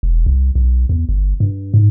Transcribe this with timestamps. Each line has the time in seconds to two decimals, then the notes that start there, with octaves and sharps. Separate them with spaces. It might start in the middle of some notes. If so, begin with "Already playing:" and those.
0.03 E1
0.26 C2
0.55 B1
0.89 E2
1.09 G1
1.40 G2
1.74 G#2